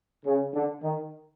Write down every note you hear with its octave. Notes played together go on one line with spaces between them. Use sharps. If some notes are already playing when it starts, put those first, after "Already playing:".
C#3
D3
D#3